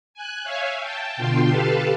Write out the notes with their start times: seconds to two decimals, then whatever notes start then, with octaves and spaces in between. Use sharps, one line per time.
0.14 G#5 F#6
0.44 C#5 E5 F5 G#5
0.79 G5 A5
1.17 B2 D3 F4 G5 C6
1.49 G4 A4 B4 F5 A5